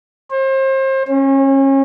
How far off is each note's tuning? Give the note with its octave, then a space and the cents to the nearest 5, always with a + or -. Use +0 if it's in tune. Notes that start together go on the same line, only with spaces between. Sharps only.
C5 +35
C#4 -30